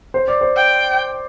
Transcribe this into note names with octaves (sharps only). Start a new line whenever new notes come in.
C5
D5
C5
G5